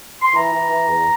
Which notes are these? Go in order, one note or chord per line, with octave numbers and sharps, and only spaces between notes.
C6
E3 A#5
E3
E3
E2